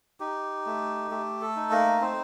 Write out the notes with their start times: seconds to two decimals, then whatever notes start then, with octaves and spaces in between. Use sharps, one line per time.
0.20 D#4 G4
0.66 A3
1.11 A3 G4
1.42 A4
1.56 D#4
1.71 A#3 A#4
2.01 C4 D#4 C5